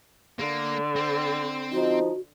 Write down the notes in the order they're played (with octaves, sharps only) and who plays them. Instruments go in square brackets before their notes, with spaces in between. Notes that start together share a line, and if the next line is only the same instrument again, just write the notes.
[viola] D3 [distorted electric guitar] A#3
[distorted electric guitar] C4
[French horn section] F3 D#4 [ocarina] F#4